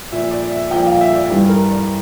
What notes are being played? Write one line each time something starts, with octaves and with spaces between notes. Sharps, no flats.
A#2 F3 E5
D5
E5
A#2 F3 G5
F5
E5
D5
G2 E3 G3
A#4
D5